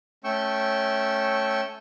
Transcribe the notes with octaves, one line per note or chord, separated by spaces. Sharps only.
A3 C#4 G5 C#6 E6